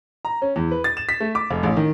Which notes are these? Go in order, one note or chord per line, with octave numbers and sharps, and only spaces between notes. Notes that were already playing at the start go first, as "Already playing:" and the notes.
A#5
C#4
E2
B4
A6
E7
B6
A3
D6
F1
A1
D#3